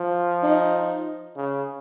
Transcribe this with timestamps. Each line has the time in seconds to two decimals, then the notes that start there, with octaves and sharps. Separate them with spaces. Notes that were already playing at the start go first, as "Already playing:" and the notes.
Already playing: F3
0.43 D#4
1.36 C#3